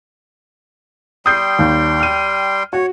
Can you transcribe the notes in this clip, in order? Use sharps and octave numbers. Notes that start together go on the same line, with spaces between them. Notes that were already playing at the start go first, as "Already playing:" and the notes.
G3 G5 C6 D#6 G6 C7
D#2
F6 D#7
F#4 C#5